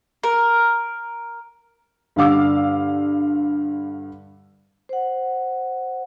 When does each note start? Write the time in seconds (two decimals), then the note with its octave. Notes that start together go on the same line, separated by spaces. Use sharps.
0.23 A#4
2.16 G2 D3 F5 D6 E6
4.89 C5 F#5